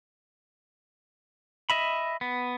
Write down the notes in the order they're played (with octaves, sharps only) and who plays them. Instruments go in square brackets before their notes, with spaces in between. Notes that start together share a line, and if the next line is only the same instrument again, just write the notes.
[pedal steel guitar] D#5 E5 B5
B3